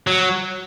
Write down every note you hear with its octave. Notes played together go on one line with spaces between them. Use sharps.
F#3